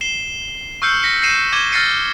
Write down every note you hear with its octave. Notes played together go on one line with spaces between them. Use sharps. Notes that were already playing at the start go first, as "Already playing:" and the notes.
C7 E7 G7
C#6 E6 F6 G6 C7 C#7
A#6 B6 C#7
A#6 C7 C#7 D#7 E7
D6 G#6 D#7 G7
F6 A6 A#6 C7 C#7 D#7